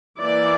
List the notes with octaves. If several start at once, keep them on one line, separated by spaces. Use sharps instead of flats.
E3 A#3 E4 D5